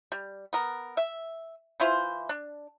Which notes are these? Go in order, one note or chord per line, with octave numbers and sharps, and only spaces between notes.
G3
B3 A#4
E5
E3 E4 F4 C5
D4